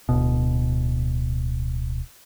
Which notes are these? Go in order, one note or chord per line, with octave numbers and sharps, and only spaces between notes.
D1 G#1 B2